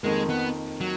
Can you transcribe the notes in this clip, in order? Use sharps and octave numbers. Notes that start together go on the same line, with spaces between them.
F2 D#3 G#3 A#3
B3
F#3